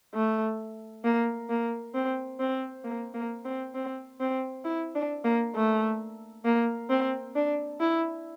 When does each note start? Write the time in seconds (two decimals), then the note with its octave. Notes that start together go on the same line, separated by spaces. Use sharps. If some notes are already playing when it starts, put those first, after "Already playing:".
0.15 A3
1.04 A#3
1.49 A#3
1.94 C4
2.40 C4
2.84 A#3
3.14 A#3
3.45 C4
3.75 C4
4.20 C4
4.65 E4
4.95 D4
5.24 A#3
5.55 A3
6.45 A#3
6.90 C4
7.35 D4
7.80 E4